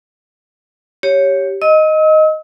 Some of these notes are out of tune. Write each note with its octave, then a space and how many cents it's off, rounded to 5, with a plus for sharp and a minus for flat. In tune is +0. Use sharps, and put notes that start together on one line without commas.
G4 +0 C#5 +0
D#5 +0 E6 -45